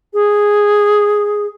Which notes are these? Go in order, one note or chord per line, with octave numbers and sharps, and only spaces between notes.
G#4